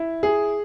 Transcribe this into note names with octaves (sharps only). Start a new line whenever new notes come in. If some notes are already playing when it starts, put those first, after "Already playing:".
Already playing: E4
G#4